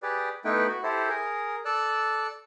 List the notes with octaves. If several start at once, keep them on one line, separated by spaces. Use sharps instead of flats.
G4 G#4 B4 D5
A3 B3 D#4 E4 B4 G5
F#4
E4 G4 A4 C5
G#4 A#4
A4 D5 E6 F#6